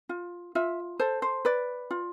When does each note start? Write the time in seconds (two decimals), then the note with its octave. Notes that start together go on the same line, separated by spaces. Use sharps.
0.09 F4
0.55 F4 E5
0.99 A4 C5
1.22 C5
1.45 B4 D5
1.91 F4